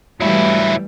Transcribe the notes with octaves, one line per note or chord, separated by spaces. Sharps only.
E3 F#3 G3 A3 E4